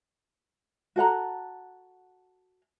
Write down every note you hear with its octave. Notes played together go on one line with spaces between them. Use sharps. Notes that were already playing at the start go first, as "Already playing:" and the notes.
F#4 A4 F#5 A#5